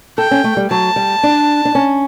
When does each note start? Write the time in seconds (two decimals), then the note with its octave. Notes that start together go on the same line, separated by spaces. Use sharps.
0.18 A4 G5
0.31 C#4
0.44 A3
0.57 G3
0.70 F#3 A5
0.96 G3
1.23 D4
1.65 D4
1.75 C#4